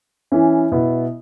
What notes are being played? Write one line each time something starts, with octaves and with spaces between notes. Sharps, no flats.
E3 C#4 E4
B2 B3 E4